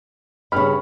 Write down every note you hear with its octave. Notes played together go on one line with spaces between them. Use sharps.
G2 C#3 B5 F6